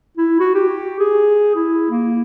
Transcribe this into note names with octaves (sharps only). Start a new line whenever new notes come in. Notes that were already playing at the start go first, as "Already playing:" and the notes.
E4
F#4
G4
G#4
E4
A#3